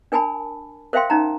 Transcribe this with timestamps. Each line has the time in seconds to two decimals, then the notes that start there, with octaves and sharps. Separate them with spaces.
0.12 D4 A#4 G#5 A5 B5
0.93 A#4 C5 E5 F5 G5 C6
1.10 C#4 D#4 A#5